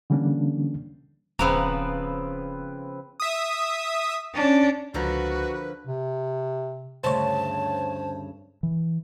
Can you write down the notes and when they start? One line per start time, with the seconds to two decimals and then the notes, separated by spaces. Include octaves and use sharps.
0.10 D3 E3 G3 A#3 C#4 D4
1.39 D#1 C#3 F3 B3 C4 B4 A#5 D6
3.20 E5 D#6
4.34 C#4 D4
4.94 C#2 D3 F3 F#4 A#4 B4
5.85 C3
7.04 D2 G2 C#3 C5 C#5 A5
8.63 E3